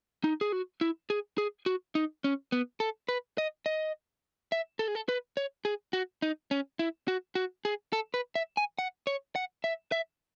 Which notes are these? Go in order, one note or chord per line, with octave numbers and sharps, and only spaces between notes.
D#4
G#4
F#4
E4
G#4
G#4
F#4
D#4
C#4
B3
A4
B4
D#5
D#5
E5
A4
G#4
A4
B4
C#5
G#4
F#4
D#4
C#4
E4
F#4
F#4
G#4
A4
B4
E5
G#5
F#5
C#5
F#5
E5
E5